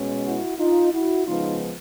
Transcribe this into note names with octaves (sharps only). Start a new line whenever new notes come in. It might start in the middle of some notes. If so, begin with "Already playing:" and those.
Already playing: B2 G#3 C#4
E4 F#4
D#4 F4
E4 F#4
C#3 F3 G#3 B3 D#4 F4